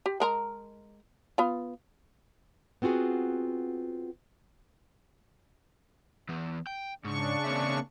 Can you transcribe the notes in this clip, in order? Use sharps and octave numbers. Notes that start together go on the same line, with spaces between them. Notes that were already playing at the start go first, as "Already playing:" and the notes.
G4
G#3 A#4 A#5
B3 F4
B3 C4 F4 F#4 G#4
E3 B3
G5
G#2 C#3 D4 C#6
A#3 C4 E5